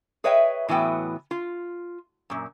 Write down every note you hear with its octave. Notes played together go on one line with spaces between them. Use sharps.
G#4 B4 C#5 D#5 E5 G5
A2 E3 F#3 B3 G5
F4
F#2 A#2